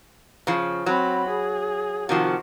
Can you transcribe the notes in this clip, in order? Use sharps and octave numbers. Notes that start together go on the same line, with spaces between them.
C#3 F3
F#3 C4 B5
G#4
C3 D#3 F3 F#4